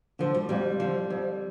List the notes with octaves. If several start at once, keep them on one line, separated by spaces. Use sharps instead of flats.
D3 F3
G3
F2 G3
D3 F3
F2